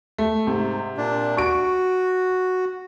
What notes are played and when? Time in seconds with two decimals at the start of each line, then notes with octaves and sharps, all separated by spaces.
0.18 A3
0.47 G#2 C3
0.97 A#2 D4
1.37 F#4 C#6 D7